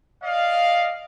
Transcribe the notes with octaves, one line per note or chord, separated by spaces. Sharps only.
D5 D#5 F5